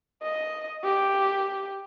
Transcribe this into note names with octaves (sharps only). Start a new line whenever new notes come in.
D#5
G4